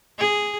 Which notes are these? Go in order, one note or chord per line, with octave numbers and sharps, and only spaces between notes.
G#4